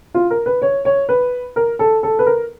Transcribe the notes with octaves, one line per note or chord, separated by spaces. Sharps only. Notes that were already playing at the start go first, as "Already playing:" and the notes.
F4
A#4
B4
C#5
C#5
B4
A#4
A4
A4
B4
A#4